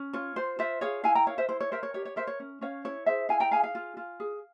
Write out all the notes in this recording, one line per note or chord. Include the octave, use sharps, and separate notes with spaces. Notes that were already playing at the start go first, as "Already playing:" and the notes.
Already playing: C#4
F4 C#5
F4 C5
F4 C5 E5
G#4 C#5 F5
E4 F5 G#5
G5 A#5
A#4 C#5 F5
C5 E5
E4 C5
C#5
A#4 C5 E5
C#5
G4 C#5
C#5
A#4 C5 E5
C#5
C#4
C#4 C#5 F5
E4 C#5
G#4 C5 E5
E4 F5 G#5
G5 A#5
G#4 F5 G#5
F5 G#5
F4
F4
G#4